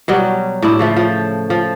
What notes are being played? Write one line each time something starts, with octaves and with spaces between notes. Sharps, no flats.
B2 F#3 G3
A2 D4 E4
C#3 F3 A3
F3
F3